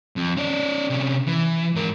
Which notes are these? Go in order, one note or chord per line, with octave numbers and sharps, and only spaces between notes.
F2
C#4 D5
C3 C#4
E3
G#2 A#4